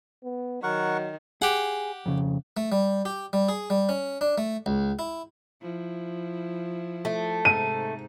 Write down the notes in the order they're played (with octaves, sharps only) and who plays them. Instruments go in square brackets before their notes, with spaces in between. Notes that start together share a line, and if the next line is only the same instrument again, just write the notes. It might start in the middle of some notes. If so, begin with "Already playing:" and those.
[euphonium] B3
[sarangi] D#3 [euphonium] F#3 [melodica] A#4 F#5 C#6
[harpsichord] G4 F#5 [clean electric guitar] G#4
[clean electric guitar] F2 C#3
[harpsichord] A3
G3
G4
G3
G#4
G3
C#4
D4
A3
C#2
E4
[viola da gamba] F3 E4
[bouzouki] A3
[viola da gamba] G#2 C3 D#4 [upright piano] D#7